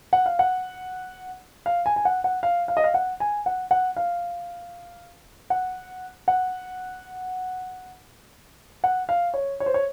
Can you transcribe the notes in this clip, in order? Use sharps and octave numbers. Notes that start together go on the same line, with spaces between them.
F#5
F5
F#5
F5
G#5
G#5
F#5
F#5
F5
F5
D#5
F5
F#5
G#5
F#5
F#5
F5
F#5
F#5
F#5
F5
C#5
C#5
C5
C#5